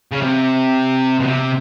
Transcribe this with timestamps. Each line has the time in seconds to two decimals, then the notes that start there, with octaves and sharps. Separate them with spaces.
0.12 C#3
0.21 C3
1.19 B2
1.26 C3